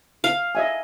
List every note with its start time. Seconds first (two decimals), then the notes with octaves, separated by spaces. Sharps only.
0.24 F5
0.55 D#5 E5 G#5